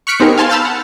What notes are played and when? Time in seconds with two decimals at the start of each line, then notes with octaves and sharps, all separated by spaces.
0.07 C#6 F6 F#6 B6 C#7 D7
0.20 B3 C4 D#4 G4 G#4 A#4
0.38 F5 G#5 A5 C6 F6
0.49 A5 B5 E6 F6 G6 A6
0.65 F#5